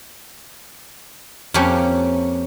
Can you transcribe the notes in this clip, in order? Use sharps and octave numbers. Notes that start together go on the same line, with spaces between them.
F2 A#3 C#4 G4 C#5